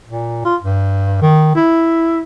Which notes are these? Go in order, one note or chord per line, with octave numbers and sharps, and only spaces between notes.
A#2
F4
G2
D#3
E4